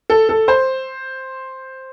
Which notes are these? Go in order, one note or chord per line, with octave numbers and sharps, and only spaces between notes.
A4
A4
C5